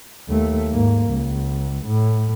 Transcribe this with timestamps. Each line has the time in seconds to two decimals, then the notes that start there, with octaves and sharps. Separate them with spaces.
0.29 D#2 A3
0.73 G#2 A#3
1.10 C#2
1.86 A2